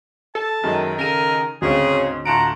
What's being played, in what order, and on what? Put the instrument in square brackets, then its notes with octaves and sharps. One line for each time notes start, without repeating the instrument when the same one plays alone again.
[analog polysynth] A4 [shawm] A5
[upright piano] F#2 F#3 G#3 [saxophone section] D#3
[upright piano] C#3 G#4 D#7 [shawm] A#4
[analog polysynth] D2 [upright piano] G#2 C4 [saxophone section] C#3 [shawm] G#4
[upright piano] A2 A5 D7 [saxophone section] D3 F4 F#5 [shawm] A#5